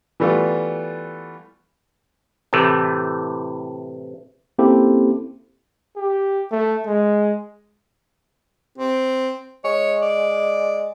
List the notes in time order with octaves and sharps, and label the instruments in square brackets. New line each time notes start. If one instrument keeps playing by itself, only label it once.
[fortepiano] E3 G3 A3 B3 F4
[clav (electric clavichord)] A2 C3 E3 A3
[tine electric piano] A#3 C4 C#4 E4 G4 A4
[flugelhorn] G4
A3
G#3
[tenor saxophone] C4
[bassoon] G#3 [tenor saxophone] C#5
[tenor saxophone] D5